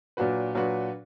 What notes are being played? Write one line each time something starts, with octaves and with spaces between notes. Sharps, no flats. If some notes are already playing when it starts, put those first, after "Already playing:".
A#2 F#3 D4 F#4 B4
A#2 F#3 D4 F#4 B4